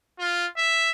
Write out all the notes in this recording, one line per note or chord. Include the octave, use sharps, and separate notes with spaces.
F4
E5